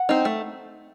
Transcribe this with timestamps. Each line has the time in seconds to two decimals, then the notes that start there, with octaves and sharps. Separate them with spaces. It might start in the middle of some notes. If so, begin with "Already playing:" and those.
Already playing: F#5
0.09 C4 D#4
0.25 A3